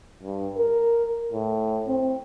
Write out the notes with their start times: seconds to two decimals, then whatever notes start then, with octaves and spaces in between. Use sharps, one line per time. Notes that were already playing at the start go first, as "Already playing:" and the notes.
0.23 G2
0.57 A#4
1.33 A2
1.88 C4